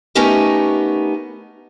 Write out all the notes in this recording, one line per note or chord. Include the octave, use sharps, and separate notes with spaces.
A3 B3 C#4 D#4 G4 A#4